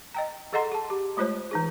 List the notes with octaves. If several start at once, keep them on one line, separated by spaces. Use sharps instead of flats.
D#5 G5 A#5
G#4 A4 D#5 F#5 A#5 C6
G#4 A5
G4
G#3 A3 F4 C5 C#5
E3 D#4 G#4